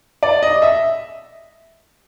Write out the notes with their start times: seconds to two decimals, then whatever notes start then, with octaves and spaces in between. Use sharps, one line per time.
0.23 D5
0.43 D#5
0.62 E5